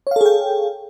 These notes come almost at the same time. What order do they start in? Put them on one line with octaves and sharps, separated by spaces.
C#5 F5 A4 G#4 G5